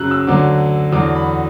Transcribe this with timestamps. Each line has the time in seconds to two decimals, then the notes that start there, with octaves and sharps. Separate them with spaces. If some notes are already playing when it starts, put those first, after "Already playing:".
Already playing: F#2 C#3 F#3 E6 F#6
0.11 E6
0.27 D2 D3 F#3 D6
0.92 E2 D3 F#3 D6
1.15 B5